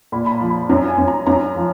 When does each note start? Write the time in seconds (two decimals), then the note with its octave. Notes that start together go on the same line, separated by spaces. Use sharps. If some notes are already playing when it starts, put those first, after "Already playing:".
0.12 A#2 B5
0.26 B5
0.32 A#5
0.41 F3
0.50 B5
0.69 F#2 A#5
0.88 G#5
0.98 F#2
1.08 A#5
1.27 F#2 A#5
1.56 F3